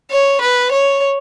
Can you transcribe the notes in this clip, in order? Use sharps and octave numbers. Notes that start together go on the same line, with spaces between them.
C#5
B4
C#5